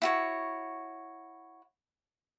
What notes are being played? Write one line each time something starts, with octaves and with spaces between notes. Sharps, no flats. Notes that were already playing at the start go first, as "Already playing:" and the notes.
E4 F#4 C#5